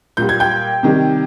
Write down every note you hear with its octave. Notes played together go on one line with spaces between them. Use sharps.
A#2 G3 G6
G#6
G5 G6
C3 D#3 G3